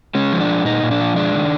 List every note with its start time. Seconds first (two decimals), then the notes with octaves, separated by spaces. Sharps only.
0.15 G#3 C#4
0.32 F3
0.40 D4
0.49 G#3
0.65 A#2 D#4
0.83 A#2
0.91 D4
1.00 F3
1.16 G#3 D4
1.35 D#3